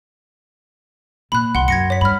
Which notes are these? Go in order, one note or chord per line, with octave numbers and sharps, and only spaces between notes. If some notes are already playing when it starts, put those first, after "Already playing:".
A#2 B5 F#6
C2 F#5 C6
F#2 G#6 A#6 C#7
C#5 B6
G2 B5 F6